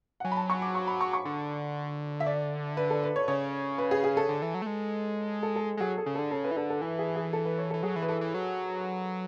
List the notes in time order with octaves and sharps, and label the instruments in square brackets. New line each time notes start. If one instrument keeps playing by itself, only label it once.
[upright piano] F#5
[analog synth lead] F#3 [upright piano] G#5
[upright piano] B5
A5
C#6
D6
C#6
B5
C#6
C#6
[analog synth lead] D3
[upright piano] E5
D5
B4
A4
B4
C#5
[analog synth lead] C#3 [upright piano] C#5
[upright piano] B4
G#4
G#4
A4
[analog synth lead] D3
E3
F#3
A3
G#3
[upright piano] A4
A4
[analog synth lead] G#3
[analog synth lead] F#3 [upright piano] G#4
[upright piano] A4
[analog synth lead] C#3
[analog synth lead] D3 [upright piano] A4
[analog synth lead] C#3 [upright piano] A4
[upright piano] B4
[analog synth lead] E3
[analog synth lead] D3 [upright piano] A4
[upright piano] A4
[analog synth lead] E3 [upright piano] B4
[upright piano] G#4
G#4
A4
B4
C#5
[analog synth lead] E3 [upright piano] A4
[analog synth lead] F#3 [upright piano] G#4
[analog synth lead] E3
[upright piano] B4
[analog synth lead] E3 [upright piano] A4
[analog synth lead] E3
F#3